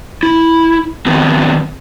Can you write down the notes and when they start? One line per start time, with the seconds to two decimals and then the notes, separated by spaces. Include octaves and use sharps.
0.23 E4
1.06 D#3 F#3 B3 C4